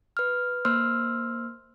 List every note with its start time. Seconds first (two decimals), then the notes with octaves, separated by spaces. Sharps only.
0.17 B4 F6
0.65 A#3 C5 C6 E6 F6